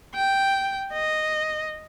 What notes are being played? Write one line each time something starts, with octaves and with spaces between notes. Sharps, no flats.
G5
D#5